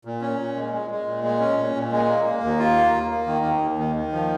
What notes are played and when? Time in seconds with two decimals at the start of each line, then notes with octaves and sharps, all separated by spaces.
0.05 A#2
0.22 C#4
0.39 A#2
0.57 G#3
0.73 G#3
0.91 G#3
1.06 A#2
1.24 G#3
1.40 C#4
1.57 A#2
1.75 A#2
1.92 G#3
2.09 A#3
2.25 A#3
2.43 D#2
2.59 F4
2.77 A#3
2.94 A#3
3.11 A#3
3.27 D#3
3.45 D#2
3.61 D#2
3.79 D#3
3.96 D#3
4.12 F3